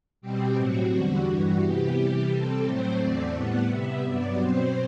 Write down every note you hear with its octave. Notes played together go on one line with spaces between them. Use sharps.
B2 G3 C4 G4
A2 F#3 C4 F#4
E2 D3 G3 F#4
G2 E3 G3 F#4
C3 E3 B3 G4
C3 E3 G3 G4
C3 G3 C4 A4
A2 F#3 A3 C4 C5
E2 D3 A3 C4 D5
A2 G3 B3 F#5
C3 G3 B3 E5
G2 F#3 B3 D5
B2 F#3 C4 C5